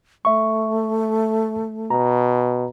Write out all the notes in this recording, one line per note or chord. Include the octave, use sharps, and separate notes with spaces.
A3 E5 C#6
B2 A#5